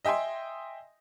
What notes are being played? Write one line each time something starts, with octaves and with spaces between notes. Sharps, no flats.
D#5 E5 G5 G#5 C6